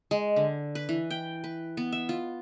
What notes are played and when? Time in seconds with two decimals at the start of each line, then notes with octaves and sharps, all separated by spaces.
0.11 G#3
0.36 D3
0.75 B4
0.89 E3
1.11 G5
1.44 B4
1.77 B3
1.92 E5
2.09 F4